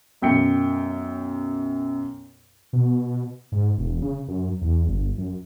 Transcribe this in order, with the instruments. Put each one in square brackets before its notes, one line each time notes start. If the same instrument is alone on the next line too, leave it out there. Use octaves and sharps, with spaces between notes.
[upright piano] B1 F#2 G5 C#7
[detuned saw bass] B2
G#2
E1
C#3
F#2
E2
G1
F#2